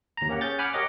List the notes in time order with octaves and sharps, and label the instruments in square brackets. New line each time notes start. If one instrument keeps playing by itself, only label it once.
[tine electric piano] D#2 A#5
A#3 C#4 G4 F#5
C#4 G#4 G6 A6
F#5 G#5 B5 D6 F6
G4 A#4 C#5 D#5 F#5 D6